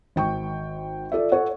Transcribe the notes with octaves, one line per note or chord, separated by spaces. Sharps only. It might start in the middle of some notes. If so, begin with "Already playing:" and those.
G#1 G5 C#6
F4 A4 D5 E5
A4 C#5 F#5